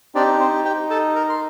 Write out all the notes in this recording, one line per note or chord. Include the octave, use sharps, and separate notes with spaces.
C4 D4 D#4 G4 D5
C4 C5
G4 G5
A4 A5
A#4 A#5
C6